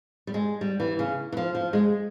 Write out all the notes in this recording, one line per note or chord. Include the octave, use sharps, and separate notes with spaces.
G3
G#3
G3
E3
C#3
E3
F3
F3
G#3